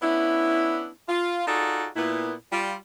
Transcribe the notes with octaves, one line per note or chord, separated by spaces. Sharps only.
B3 C#4 D4 E4
F4
D#4 F4 F#4 G#4 A4 D5
A#2 B3 E4
G3 F4